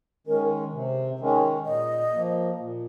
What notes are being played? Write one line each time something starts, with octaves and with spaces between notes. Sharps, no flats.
D#3 G#3 C#4 A#4
C3
D#3 G#3 C#4
A#2 D#5
F3 A#3
A#2